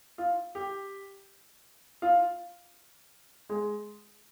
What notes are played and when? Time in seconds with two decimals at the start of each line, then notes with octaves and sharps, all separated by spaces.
0.18 F4
0.55 G4
2.02 F4
3.49 G#3